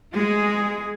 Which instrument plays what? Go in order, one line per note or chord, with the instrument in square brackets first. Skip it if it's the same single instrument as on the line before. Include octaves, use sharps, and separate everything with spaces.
[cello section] G#3 [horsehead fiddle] G#4